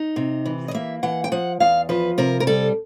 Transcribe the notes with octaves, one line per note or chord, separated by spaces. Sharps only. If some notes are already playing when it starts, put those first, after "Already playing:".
Already playing: D#4
C3
E3
D#5
A#3 E5
E3 F#5
G5
F3 F#5
E2 F5
F3 B4
C3 A#4
A#4
G3 A4